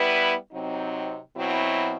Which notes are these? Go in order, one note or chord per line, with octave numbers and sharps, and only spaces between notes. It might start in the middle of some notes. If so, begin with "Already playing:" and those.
Already playing: G3 B3 E4 B4
C3 F#3 C4 D#4
B2 F#3 C4 E4